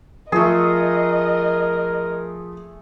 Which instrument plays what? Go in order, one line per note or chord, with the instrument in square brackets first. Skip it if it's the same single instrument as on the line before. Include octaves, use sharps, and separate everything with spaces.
[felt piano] F3 [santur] A3 G#4 [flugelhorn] A#4 [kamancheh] D#5